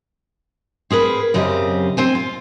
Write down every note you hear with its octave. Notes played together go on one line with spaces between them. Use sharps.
C4 G#4 A#4 B4
F#2 C#3 C4 G4 D#5 A#5
C4 C5 G#5
F4